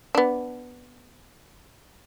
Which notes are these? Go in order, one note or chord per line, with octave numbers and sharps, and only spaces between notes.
B3 D4